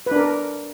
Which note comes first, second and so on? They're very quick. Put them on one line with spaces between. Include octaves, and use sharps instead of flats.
B4 D4 A#4